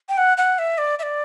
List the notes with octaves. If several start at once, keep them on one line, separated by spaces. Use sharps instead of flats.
G5
F#5
F#5
E5
D5
E5
D5